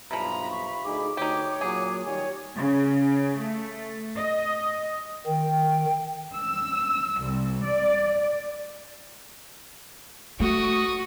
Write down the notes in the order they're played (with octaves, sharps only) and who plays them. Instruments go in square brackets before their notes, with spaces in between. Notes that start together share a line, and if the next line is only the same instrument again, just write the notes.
[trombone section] B1 G2 [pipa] C3 F3 [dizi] A#5 [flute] B5
[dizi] C#6
[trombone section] D2 D#4 G#4 [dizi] D6
[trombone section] D2 [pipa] D#4 G4 [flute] C#5
[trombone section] A#2 F#3 [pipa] G#4
[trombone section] D#3 F#3 G3 [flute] C#5 [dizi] G#5
[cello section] C#3
A3
D#5
[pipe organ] D#3 [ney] G5
[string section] E6
C2
D5
[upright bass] A3 [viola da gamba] F#4 [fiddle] C#6 D#6